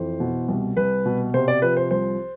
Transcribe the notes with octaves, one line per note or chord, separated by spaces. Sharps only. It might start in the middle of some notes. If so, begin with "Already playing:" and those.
Already playing: F2 E3 C5
B2
C2
C2 B4
B2
C3 C5
D5
F3 B4
C5
C2 C5